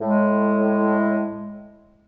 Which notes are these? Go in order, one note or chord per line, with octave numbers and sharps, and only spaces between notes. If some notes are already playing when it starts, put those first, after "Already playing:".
A2 G#3